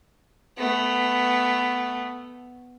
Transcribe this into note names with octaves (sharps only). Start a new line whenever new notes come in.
A3 B3